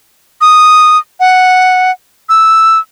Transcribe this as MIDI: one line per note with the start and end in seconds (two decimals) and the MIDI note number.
0.41 0.98 87
1.20 1.91 78
2.29 2.79 88